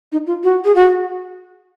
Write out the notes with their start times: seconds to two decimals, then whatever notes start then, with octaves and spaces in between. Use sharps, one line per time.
0.12 D#4
0.27 F4
0.43 F#4
0.65 G#4
0.75 F#4